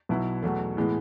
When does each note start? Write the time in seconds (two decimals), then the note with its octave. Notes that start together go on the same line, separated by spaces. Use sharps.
0.09 B1 B2 F#3 B3 E4
0.43 E2 B2 F#3 A3
0.77 A2 E3 G#3 B3